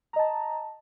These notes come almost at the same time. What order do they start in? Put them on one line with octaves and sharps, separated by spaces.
A#5 D#5 A5